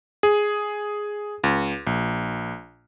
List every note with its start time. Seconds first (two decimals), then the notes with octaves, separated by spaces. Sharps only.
0.23 G#4
1.44 C#2
1.87 A#1